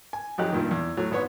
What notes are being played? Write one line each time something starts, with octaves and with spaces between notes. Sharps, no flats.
G#5
F2 F#3 D#4 G4 F#6
G2 A#2 D#3
E2
A2 F#3
G#1 B3 C#5